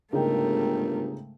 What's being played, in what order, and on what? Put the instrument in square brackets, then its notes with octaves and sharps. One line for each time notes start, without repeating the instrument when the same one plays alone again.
[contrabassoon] G1 [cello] G#2 A3 [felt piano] C#3 D#4 G5 [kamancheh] A#4